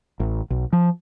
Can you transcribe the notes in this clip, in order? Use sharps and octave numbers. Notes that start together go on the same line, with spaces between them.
A1
B1
F3